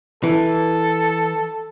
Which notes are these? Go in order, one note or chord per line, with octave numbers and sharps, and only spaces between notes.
E3 A4